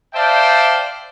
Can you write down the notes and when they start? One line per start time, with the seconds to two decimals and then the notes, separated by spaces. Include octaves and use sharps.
0.14 C5 D5 E5 F5 G5 A5